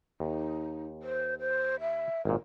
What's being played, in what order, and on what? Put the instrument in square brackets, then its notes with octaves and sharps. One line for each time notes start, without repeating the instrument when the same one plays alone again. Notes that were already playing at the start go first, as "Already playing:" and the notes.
[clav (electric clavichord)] D#2 [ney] D#4
[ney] C5
C5
E5
[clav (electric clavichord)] G#1 A#2 [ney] A#4